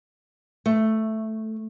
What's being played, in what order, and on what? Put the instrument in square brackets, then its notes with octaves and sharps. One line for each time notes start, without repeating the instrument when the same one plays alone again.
[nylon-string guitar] A3